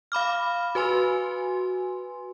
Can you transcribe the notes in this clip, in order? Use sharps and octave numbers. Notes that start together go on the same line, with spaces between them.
F5 B5 D6 F6
F#4 B4 G#5 C6